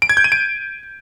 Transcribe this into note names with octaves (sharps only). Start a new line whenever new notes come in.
D7
G#6
G6
D#7
D7